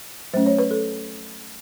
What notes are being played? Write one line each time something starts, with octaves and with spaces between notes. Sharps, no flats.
F#3 A3 C#4 C5
C#5
B4
A4